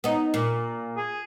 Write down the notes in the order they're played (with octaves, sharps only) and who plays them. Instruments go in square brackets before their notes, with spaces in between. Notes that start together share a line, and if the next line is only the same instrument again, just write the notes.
[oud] B3 D#4
A#2
[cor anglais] G#4